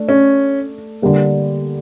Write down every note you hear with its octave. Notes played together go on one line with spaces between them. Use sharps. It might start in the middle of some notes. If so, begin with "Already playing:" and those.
Already playing: A3 D4
C#4
D3 G3 A#3